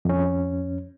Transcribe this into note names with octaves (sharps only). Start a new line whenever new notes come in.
F2 C#4